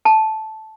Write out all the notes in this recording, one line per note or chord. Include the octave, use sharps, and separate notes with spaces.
A5